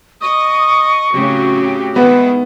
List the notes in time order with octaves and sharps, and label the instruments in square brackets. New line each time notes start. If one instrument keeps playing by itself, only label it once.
[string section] D#5 [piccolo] C#6 [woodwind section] D#6
[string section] A2 C#3 F#3 [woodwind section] C4 F#4 G4
[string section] D#3 G#3 E4 [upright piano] B3